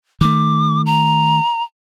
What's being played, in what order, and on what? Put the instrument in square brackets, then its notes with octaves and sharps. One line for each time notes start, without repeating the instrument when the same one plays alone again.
[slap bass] D#3 A3 [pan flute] D6
[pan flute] A#5